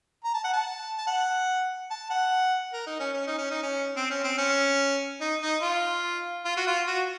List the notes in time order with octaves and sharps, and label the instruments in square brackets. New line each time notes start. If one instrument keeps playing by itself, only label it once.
[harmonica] A#5
A5
F#5
A5
A5
F#5
A5
F#5
A#4
D#4
C#4
C#4
D#4
C#4
D#4
C#4
C4
C#4
C4
C#4
D#4
D#4
F4
F4
F#4
F4
F#4